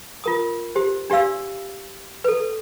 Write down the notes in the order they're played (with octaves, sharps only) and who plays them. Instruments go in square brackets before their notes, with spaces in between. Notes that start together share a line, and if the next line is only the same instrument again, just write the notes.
[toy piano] F4 A#4 D#6
G4 C5
D4 G4 D5 F5 E6
A4 B4